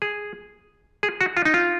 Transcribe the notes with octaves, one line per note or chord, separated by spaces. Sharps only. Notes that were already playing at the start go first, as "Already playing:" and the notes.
G#4
G#4
F#4
F4
D#4
F4